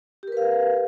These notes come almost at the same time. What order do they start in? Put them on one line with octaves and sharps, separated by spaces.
G4 A#4 B4 F5